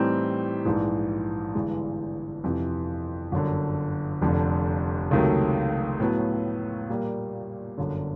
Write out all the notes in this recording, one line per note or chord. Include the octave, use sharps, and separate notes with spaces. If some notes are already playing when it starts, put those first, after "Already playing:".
Already playing: A2 E3 G3 C4 D#4
A#1 G#2 E3
G1 G2 E3 G#3
F2 C3 E3
G1 F#2 D3
F1 F2 D3
C#2 C3 D#3 F#3 A3
A2 F#3 B3
A#2 G3 A#3
G1 F#2 D3